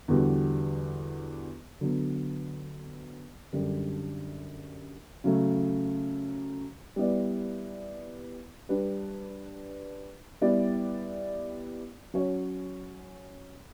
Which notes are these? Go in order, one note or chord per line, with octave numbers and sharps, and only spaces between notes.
E2 D3 G3 B3 F#4
D3 F#3 B3
F#2 D3 G3 D4
C#3 F#3 A3
G3 B3 E4 B4 D5
G3 D4 G4 B4
G3 B3 E4 G4 D5
F#3 C#4 F#4 C#5